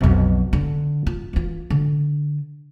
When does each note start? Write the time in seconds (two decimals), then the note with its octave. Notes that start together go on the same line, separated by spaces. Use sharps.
0.01 B1 F2
0.53 D3
1.07 F4
1.33 E3 F4
1.70 D3